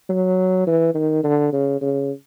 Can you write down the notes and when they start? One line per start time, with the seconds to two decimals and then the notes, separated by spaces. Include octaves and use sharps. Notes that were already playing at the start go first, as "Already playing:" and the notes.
0.09 F#3
0.67 E3
0.94 D#3
1.23 D3
1.52 C#3
1.81 C#3